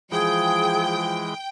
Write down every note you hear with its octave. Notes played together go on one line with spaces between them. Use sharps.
E3 F3 G#3 G#4 G5